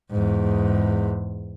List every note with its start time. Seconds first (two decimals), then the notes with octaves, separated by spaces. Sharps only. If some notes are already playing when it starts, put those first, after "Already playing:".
0.11 E2 G#2